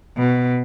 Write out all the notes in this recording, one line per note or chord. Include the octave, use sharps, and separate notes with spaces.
B2